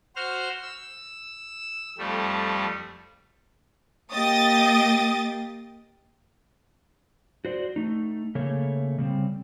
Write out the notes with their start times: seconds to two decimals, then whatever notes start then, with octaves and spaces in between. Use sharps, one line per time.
0.16 F#4 C5 F6
0.62 E6
1.98 F2 G3 A3
4.13 A#3 G4 D#5 D#6 A6
7.45 F#4 C5 D5
7.76 A3 D#4
8.35 C#3 A3 A#3 C#5
8.98 C#3 G3 C4